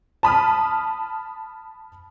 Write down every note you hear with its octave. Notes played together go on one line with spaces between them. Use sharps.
A5 B5 D#6 F6